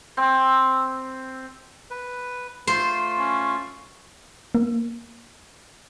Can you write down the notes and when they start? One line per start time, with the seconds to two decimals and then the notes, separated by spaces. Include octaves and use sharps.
0.17 C4
1.91 B4
2.67 A3 F4 C5
3.19 C#4
4.55 A#3